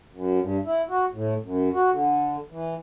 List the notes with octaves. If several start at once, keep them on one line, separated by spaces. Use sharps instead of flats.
F#2
G2
E4
F#4
A2
F#2
F#4
D3
E3